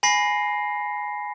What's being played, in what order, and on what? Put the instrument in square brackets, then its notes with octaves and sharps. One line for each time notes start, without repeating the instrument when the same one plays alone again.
[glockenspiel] G#5 B5 A#6 C7